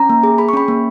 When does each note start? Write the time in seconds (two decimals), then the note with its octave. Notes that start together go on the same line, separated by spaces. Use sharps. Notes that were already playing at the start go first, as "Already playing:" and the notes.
Already playing: C#4 A#5
0.09 A#3
0.23 G#4
0.38 G#4 B5
0.49 C#6
0.53 C#4 B5
0.68 A#3